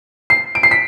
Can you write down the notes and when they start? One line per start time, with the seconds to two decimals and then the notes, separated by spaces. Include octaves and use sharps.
0.30 C7
0.55 D7
0.63 C7
0.71 B6